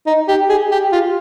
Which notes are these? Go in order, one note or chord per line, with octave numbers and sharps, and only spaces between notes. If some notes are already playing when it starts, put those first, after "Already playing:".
D#4
G4
G#4
G4
F4